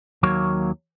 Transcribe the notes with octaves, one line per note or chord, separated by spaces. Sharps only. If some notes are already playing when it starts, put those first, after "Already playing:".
D#2 F#3 A#3 C#5